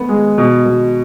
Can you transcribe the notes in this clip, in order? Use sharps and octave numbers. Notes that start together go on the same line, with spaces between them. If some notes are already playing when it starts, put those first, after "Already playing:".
Already playing: A3 B3
G#3
B2
B2